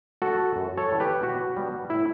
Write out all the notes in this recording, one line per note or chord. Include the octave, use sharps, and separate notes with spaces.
A3 D4 F#4 A4
F#2
A4 C#5
E3 G3
G4 B4
B2 F#4
G3 B3 D4
A2 E4